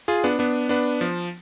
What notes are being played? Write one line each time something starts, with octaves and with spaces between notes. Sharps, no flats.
F4 G#4
B3 D4
B3 D4
B3 D4
F3